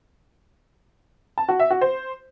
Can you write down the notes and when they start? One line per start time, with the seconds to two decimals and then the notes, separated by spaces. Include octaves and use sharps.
1.38 A5
1.49 F#4
1.60 E5
1.70 F#4
1.81 C5